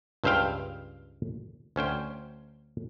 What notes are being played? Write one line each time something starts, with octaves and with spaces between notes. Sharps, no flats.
C#2 G2 C5 E5 F5 G5
D2 C#4 C5 G5